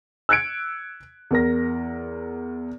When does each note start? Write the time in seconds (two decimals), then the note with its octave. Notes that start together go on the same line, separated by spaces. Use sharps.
0.29 E6 F#6 G#6 C#7 D7
1.31 E2 A#4 A#6